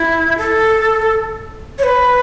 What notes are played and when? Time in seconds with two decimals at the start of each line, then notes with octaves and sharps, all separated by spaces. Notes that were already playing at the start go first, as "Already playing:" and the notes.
Already playing: E4
0.38 A4
1.78 C#5
1.83 B4